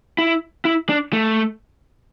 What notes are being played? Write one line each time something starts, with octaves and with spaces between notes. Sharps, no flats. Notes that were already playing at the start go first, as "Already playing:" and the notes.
E4
E4
D4
A3